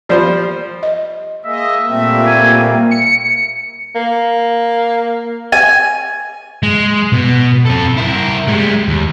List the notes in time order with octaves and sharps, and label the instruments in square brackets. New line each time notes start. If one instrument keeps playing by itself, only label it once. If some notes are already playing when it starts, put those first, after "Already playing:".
[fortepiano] F3 G3 C5 [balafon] G4 D5
[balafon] D#5
[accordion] G#3 A#3 [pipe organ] D#5 [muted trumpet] E5
[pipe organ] A#2 G3 A#3 [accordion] A3 C4
[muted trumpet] G#5
[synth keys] C#7
[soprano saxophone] A#3
[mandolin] G#5
[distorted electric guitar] G#3
B2
C4 A4
E4 A#4
G3 G#3
D#2